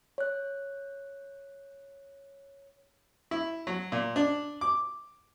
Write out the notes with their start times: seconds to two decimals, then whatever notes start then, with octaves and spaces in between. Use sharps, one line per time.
0.18 C#5 F#6
3.31 E4
3.67 F#3
3.92 A#2
4.16 D4
4.61 D6